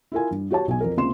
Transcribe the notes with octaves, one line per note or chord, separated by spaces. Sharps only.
E4 F4 A#4 G#5
G2
F#4 G4 C#5 A5
B1 G#5
F2 A#4
C#2 C3 A#3 C6 E7